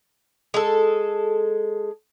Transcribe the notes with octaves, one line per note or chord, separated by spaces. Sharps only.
G#3 A4